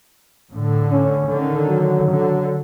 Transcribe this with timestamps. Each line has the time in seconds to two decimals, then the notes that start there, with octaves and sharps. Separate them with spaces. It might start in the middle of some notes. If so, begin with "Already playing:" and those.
0.51 A2 D3
0.92 C#4
1.27 D3 D#3
1.68 F#3
2.09 D3